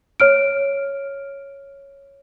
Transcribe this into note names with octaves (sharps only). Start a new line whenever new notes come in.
C#5 F6 D7